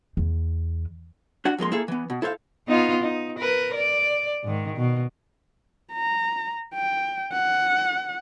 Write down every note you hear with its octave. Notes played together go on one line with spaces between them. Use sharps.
E2
D4 F#4 F#5
F2 G#3 A#3 C6
A#3 E4 G#4 A4
E3 B3
B2
E4 A4 C5 E5 F5
B3 D#4 F4
D#4
A#4 B4
D5
G#2 D#3
B2
A#5
G5
F#5